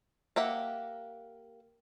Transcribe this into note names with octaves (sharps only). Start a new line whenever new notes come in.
A#3 G4 E5 F#5